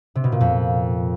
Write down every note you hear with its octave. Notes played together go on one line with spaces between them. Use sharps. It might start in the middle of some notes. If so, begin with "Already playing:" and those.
C3
B2
A#2
F2